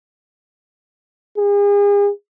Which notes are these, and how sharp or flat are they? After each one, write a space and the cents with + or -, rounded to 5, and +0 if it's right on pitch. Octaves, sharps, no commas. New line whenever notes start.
G#4 -40